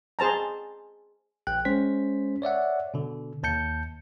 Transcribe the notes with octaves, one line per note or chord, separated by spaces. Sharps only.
G#4 C5 A5 A#5
A#1 G5 F#6
G#3 C#4 C5 B6
C#5 D5 E5 F#5
B2 D3
D#2 A5 G6 C#7